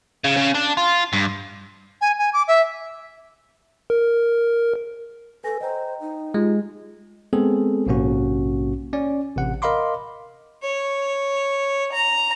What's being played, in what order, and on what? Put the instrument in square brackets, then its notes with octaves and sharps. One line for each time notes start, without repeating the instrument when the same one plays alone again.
[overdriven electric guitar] C#3
C#3
D4
F4
G2
[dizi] G#5
G#5
D6
E5
[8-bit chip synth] A#4
[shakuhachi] A4 [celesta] B4 G#5 A#6
[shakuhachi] C5 [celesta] D#5 G5 A#5
[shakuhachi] D#4
[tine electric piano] G#3 [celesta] F4 G4
[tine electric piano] G#3 B3 C4 G#4 A4
A#1 G#2 C3 A#3 C#4 F#4
C#4 D5
A1 C3 F#5
A#4 D#5 F5 B5 C6 D6
[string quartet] C#5
A#5